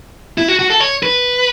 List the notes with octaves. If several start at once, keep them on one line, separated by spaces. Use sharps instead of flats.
E4
F#4
F#4
A4
C#5
B4